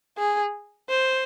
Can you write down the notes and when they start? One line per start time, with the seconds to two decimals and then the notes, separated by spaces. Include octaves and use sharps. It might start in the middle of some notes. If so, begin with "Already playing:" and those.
0.18 G#4
0.89 C5